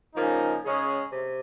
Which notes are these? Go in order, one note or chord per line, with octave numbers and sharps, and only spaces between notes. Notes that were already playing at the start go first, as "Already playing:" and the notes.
C#3 F3 A#3 D#4
C#3 G#3 C#4 G#4
C3